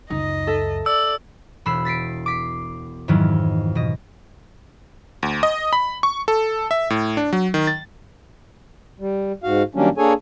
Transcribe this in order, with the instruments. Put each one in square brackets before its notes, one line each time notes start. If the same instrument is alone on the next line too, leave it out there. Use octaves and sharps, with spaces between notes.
[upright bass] C#2 F#2 [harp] D#4 [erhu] D#5
[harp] A4 E5
[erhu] D5 [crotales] E6
[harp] E1 B3 B5 E6 C7 E7
A6 B6 C7 D7
D6 B6 C7
F2 G#2 D#3 E3 F#3 E4
B2 D#5
[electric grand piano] D2
D#5
B5
C#6
A4
E5
A2
D4
F#3
D#3
A6
[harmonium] G3
G#2 F#4 F5
D#3 F#3 G3 A#3 C#4 D4
A#3 D4 G#4 A4 C#5 G#5